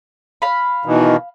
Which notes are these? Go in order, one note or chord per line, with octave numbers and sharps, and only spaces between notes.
F5 B5
B2 D#3 E3